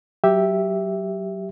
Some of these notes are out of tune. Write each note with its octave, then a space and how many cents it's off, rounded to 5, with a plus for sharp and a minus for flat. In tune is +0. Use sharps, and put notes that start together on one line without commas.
F#3 +20 G4 +0 E5 +0